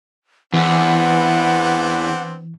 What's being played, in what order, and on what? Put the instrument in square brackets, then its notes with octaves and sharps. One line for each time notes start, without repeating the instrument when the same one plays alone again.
[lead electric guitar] E2 [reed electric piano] E3 [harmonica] B3 C4 D4 [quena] F#5